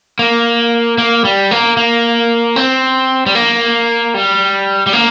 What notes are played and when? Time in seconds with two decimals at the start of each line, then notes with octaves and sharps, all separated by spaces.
0.19 A#3
0.98 A#3
1.25 G3
1.51 A#3
1.77 A#3
2.56 C4
3.26 G3
3.35 A#3
4.14 G3
4.87 G3
4.93 A#3